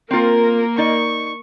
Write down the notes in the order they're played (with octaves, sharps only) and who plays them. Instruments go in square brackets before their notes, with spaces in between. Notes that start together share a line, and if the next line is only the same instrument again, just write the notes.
[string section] A#3 [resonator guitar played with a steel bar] C4 F4 [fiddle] A#4
[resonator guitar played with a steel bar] D#4 D5 D#5 [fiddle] C#6